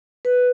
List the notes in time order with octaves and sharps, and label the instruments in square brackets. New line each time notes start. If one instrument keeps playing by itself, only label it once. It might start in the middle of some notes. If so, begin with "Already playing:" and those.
[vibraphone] B4